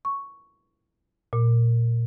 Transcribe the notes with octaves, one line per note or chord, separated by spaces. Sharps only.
C#6
A#2